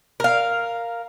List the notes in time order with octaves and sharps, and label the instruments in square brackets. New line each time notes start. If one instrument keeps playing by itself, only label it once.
[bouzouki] A#4 F5